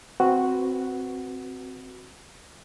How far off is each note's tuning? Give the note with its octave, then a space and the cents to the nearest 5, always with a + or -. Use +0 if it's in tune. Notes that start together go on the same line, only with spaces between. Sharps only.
C4 +0 F#4 +0 B4 +0